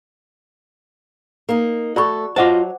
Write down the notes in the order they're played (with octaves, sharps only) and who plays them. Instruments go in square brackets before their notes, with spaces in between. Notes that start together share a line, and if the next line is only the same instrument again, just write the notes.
[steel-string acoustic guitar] A#3 D#4
[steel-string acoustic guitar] A3 A4 [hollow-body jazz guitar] F#4 [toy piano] D5 B5 C#6
[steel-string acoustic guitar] F#3 [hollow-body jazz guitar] F4 D#5 A5 [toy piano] C5 F#5 D6